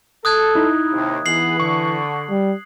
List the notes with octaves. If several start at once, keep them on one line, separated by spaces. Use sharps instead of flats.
A4 D#6 F#6 G#6
D#4 E4
D#2 C3
E3 B3 G#4 B4 C7 F#7
D3 C#6
G3